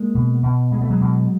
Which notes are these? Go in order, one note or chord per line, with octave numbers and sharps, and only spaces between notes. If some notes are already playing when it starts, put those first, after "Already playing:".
Already playing: G#3 A#3
B2
B2
B2 G#3
A3
F#3 G#3
B2